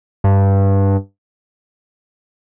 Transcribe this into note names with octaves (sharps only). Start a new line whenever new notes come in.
G2